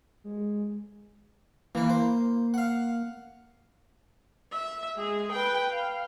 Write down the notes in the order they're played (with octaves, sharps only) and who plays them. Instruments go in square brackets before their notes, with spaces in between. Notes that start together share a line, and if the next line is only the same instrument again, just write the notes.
[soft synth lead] G#3
[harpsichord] E3 B4 [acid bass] A#3
[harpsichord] C5
F5 F#5
[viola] E5
G#3 G#4
B4 G5
F5